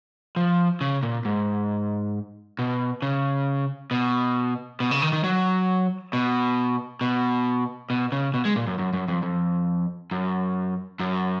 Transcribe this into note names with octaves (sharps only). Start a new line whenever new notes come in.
F3
C#3
A#2
G#2
B2
C#3
B2
B2
C#3
D#3
D#3
F#3
B2
B2
B2
C#3
B2
G#3
A#2
F#2
F#2
F#2
F2
F2
F#2
F#2